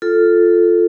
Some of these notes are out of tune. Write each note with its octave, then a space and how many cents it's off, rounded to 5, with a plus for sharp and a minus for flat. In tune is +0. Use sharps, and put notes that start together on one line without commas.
F4 +0 A4 +0